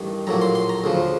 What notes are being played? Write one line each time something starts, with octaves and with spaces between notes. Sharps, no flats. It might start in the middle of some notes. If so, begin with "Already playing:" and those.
Already playing: A1 G2 D#3
A#1 A2 F#3 A#3 A#5
C6
C6
A#5
D2 C#3 F3